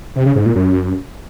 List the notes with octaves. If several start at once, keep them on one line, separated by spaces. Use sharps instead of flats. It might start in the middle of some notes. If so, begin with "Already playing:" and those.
C3
C#3
G#2
A#2
F#2